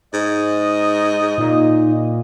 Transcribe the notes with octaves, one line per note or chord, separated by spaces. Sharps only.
G#2 D#5
A#2 D#4